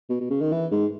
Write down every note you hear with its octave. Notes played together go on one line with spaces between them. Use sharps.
B2
B2
C#3
D#3
E3
G#2